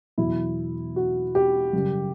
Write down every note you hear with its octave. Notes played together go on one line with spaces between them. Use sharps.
E2 B2 F#3 E4
F#4
G4
F#2 C#3 G3